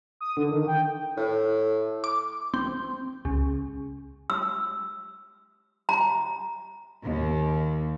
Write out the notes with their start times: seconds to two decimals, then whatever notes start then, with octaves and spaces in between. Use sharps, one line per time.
0.21 D#6
0.37 D3
0.51 D#3
0.67 G5
1.17 A2
2.04 D6
2.54 C4
3.25 C#2
4.30 E6
5.89 A#5
7.04 D#2